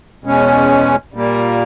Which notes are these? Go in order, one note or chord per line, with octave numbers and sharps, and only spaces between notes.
E2 B2 G#3 C#4
A#2 G3 A#3